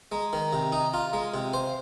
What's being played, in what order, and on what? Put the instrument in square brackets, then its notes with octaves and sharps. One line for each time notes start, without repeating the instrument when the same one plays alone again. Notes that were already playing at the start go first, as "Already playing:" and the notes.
[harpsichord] G#3 [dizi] A#5
[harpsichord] D#3
C3
D#4
F4
G#3
C3
C5
[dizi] F5